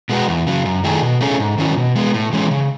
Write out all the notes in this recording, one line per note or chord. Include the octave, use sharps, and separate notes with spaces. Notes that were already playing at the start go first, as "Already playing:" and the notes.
B2 G#3 B3 F#4
E2
C#3 F#3
F#2
D#3 A3 E4 G#4
B2
A3 C#4 G#4
G#2
D#3 F#3 C#4 E4
B2
G#3 B3
A2
E3 G#3 C#4
C#3